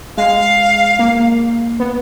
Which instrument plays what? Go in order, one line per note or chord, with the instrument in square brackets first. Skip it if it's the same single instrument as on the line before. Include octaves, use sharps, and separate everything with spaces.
[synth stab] G#3 [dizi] F5
[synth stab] A#3
B3